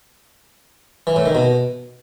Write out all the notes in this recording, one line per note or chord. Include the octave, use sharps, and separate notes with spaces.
E3
A2
D#3
B2